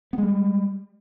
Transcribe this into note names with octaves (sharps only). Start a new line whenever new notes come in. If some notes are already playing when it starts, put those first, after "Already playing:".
G3 G#3 B3